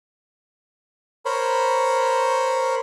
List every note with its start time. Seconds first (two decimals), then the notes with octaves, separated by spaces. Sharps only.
1.25 A#4 C5 C#5 B5